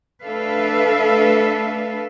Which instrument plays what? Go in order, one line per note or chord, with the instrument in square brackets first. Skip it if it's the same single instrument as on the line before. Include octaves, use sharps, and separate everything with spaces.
[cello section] A3 D4 A4 B4 E5 F5